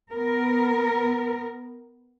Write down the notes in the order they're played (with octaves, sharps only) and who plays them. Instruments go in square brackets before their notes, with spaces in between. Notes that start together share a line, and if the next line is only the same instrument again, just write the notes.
[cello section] B3 A#4